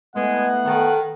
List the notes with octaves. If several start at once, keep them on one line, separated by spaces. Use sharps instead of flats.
G#3 A3 B3 E4 B4 F#5
D#3 A4 C#5